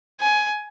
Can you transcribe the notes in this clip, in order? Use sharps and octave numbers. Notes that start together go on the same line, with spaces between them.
G#5